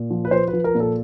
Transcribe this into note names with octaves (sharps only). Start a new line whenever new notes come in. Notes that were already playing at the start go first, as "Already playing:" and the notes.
Already playing: A#2
F3
B4
F3 C5
B4
F3
A#4
A#2
A4